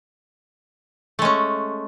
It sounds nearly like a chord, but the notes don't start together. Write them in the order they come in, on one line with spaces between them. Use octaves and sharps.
A3 G#3 C#4